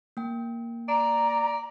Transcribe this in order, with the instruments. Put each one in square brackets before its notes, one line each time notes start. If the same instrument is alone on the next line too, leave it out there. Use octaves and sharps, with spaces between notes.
[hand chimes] A#3 G5
[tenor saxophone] D5 [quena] A#5